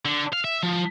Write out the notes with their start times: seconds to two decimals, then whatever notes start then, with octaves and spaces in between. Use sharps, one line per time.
0.05 D3
0.33 F5
0.44 E5
0.63 F3